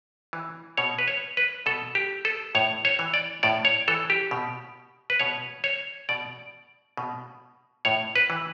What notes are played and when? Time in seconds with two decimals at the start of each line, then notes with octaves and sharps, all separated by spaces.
0.33 E3
0.77 B2 C#5
0.99 B4
1.08 C#5
1.37 B4
1.66 B2 A4
1.95 G4
2.25 A4
2.55 A2 C#5
2.85 C#5
2.99 E3
3.14 D5
3.43 A2 D5
3.65 C#5
3.88 E3 A4
4.10 G4
4.31 B2
5.10 B4
5.20 B2 C#5
5.64 C#5
6.09 B2 D5
6.97 B2
7.85 A2 C#5
8.16 B4
8.30 E3